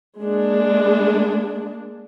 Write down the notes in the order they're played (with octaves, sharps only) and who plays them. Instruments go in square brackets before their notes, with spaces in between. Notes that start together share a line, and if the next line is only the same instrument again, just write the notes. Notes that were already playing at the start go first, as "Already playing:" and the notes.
[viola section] G#3 A#3 D4